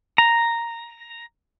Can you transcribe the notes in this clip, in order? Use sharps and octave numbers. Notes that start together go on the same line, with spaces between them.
A#5